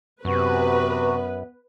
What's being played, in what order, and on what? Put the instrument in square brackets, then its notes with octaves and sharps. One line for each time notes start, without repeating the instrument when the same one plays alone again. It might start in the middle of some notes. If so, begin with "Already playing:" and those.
[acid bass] F#2 [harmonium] C3 F#4 [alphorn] B3 [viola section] B4